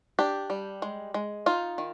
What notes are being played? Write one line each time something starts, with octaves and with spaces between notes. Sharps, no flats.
D4 G4
G3
G#3
G#3
D#4 F4
D#3